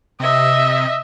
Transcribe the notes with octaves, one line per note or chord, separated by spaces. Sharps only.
C3 D#5 E5